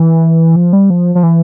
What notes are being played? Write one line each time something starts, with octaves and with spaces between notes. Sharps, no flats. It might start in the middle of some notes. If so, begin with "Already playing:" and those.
Already playing: E3
F3
G3
F3
F3
E3